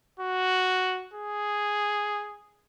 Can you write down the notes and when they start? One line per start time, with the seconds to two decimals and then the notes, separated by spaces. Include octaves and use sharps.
0.19 F#4
1.14 G#4